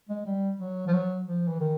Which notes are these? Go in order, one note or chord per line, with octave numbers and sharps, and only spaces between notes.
G#3
G3
F#3
F3
F#3
F3
E3
D#3